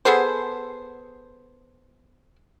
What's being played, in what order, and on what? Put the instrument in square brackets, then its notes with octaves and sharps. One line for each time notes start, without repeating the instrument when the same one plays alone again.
[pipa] B3 G#4 A4 C5